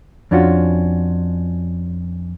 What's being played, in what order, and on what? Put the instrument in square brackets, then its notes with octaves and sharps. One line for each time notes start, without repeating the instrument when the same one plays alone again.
[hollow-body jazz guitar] F2 C#4 D4 F4 F#4